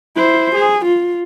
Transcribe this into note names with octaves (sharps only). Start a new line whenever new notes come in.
E4 C5
G#4
F4